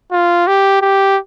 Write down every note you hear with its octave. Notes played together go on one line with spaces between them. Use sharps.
F4
G4
G4